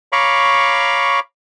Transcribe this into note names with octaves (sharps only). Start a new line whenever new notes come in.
C#5 F5 A#5 B5 C#6 D6